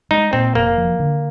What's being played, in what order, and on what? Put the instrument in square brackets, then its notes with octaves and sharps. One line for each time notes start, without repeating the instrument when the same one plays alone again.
[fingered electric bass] G#3 [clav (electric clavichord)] D#4
[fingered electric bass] A#2 [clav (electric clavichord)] C4
[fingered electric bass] F1 [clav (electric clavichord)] A#3
[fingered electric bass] F3
D3